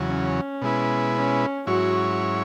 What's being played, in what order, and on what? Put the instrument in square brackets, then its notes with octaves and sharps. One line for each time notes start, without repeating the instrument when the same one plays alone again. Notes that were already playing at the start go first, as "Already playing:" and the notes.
Already playing: [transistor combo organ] E2 C#3 F#3
[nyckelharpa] C#4
[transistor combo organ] B2 G#3 E4 B4
[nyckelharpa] C#4
[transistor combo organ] G#2 F#3 C#4 E4 C#5 [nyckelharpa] F#4